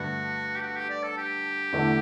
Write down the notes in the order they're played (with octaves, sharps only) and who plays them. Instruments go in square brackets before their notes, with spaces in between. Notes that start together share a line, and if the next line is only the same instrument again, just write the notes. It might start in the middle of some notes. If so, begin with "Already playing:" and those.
Already playing: [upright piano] G2 D3 A3 [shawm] F#4
[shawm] G4
F#4
G4
D5
A4
G4
[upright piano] E2 D3 A3 D4